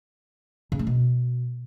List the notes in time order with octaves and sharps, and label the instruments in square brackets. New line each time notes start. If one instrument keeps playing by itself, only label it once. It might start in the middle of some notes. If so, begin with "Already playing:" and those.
[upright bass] C#3
A3
B2